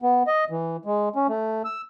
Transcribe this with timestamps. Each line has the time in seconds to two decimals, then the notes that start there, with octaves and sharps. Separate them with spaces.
0.02 B3
0.27 D#5
0.50 E3
0.85 G#3
1.16 C#4
1.29 A3
1.65 E6